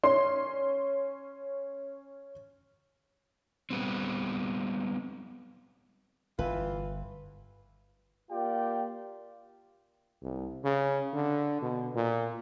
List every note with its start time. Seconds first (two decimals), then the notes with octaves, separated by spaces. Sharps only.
0.03 C#4 C6
3.70 G3 B3 C4
6.39 G1 E3 F4 B4
8.31 A#3 F4 G4 D5 G5
10.22 C2
10.64 C#3
11.13 D3
11.61 B2
11.95 A#2